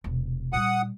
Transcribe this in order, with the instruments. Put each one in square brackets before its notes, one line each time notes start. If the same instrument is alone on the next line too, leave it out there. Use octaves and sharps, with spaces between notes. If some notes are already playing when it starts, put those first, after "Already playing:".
[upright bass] E1 C3
[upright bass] A#2 G3 [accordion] F#5 D#6